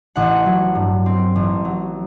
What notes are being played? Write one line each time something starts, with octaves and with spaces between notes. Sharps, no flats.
A1 F#5
F#3
G2
C4
A1
F#3